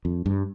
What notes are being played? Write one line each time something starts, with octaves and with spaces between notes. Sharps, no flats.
F2
G2